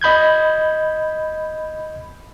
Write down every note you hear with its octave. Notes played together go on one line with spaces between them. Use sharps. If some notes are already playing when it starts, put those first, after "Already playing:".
D#5 B5 G6 G#6